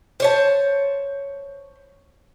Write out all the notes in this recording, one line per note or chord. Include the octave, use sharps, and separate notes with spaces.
C5 C#5 A5